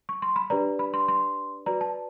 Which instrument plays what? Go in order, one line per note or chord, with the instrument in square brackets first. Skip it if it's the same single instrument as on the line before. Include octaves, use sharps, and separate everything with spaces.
[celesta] C#6
C6
B5
D4 G4 B4 D5 A#5
B5
C6
C6
F#4 B4 D5 A#5
A5